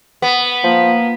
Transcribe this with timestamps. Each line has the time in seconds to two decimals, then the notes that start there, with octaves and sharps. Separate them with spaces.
0.22 B3
0.64 F3 A#3